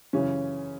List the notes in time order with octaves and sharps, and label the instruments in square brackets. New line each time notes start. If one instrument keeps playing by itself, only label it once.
[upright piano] F#2 C#3 E3 C#4